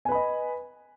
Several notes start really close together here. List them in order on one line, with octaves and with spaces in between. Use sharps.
G#5 B4 B5 D#5